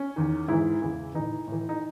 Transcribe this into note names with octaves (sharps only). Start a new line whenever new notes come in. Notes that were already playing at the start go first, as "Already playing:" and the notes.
Already playing: C#4
E2 D#3
G#2 E3 E4
E2 C#3 E3
A2 E3 D#4
A2 E3
D#4